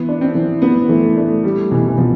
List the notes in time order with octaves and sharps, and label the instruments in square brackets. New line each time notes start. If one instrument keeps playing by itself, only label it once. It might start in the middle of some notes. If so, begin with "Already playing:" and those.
Already playing: [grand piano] E3 [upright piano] B3
[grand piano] D4
[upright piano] C4
[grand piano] E3
[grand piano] E3 [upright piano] B3
[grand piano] E3 [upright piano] A3
[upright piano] A3 [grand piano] D4
[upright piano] G3 [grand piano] A3
[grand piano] B2 [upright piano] E3
[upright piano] E3
[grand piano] B2 [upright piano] F3